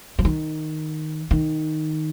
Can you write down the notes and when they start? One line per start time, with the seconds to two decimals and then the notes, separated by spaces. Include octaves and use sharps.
0.19 F3
0.25 D#3
1.31 D#3